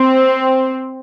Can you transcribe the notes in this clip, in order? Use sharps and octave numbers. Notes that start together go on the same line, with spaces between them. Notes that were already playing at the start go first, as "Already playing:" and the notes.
Already playing: C4